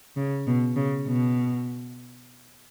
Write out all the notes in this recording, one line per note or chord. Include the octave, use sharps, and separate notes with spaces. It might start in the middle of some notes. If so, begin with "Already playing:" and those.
C#3
B2
C#3
B2